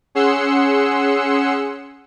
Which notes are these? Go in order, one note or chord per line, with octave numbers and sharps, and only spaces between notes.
C#4 G#4 F#5 C6 E6 C#7